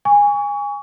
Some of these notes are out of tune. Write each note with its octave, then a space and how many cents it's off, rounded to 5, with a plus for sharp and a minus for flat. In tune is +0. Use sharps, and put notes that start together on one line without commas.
G#5 -20 C#6 +30